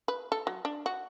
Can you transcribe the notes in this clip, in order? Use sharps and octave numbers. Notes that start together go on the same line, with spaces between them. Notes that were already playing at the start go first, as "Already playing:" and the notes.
B4
A4
F#3
D4
F#4